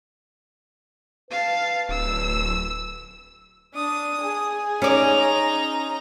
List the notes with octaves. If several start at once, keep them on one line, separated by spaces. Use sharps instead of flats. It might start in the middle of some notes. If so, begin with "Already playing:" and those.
B4 F5 A5
D1 E6
D4 D#6
G#4
C#4 D#4 D5 A#5